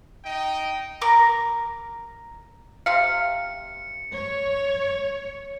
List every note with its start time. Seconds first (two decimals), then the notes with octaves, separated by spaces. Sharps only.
0.24 D#4 D#5 G5
1.01 A#4 D6
2.86 C3 F5 C#7
4.11 C#5